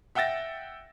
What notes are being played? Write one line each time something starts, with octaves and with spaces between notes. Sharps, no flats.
E5 F#5 G5 E6 A6 A#6